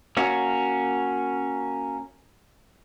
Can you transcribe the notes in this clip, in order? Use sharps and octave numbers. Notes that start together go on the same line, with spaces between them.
A#3 C#4 F#4